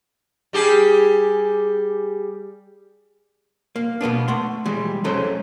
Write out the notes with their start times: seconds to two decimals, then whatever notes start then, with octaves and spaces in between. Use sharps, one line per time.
0.53 G3 G4 G#4
3.76 A#3
4.01 B2 A#3 B3 D4
4.28 A3 F#5 C6
4.66 E3 G3 G#3
5.04 F#3 G#3 A3 C#4 A4 C5